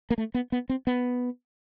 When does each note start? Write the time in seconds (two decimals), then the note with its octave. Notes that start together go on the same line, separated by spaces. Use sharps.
0.10 A#3
0.18 A3
0.34 B3
0.52 B3
0.69 C4
0.87 B3